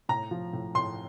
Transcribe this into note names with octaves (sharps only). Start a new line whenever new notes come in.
A2 A#5
F3
A2
A2 C6